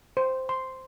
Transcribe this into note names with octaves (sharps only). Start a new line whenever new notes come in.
C5
C6